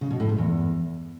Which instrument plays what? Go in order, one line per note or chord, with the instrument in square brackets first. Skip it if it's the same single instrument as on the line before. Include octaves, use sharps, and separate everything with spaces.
[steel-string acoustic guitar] C#3
B2
A2
G#2
E2